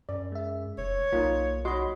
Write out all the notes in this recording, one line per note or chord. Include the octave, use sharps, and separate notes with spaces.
F#2 D5
G#3 E5
F1 C#5
B1 A#3 D#4 F4
F#4 C#5 D#5 B5 C6